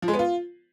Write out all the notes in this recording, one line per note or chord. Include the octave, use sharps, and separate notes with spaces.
F3
G#3
B3
F4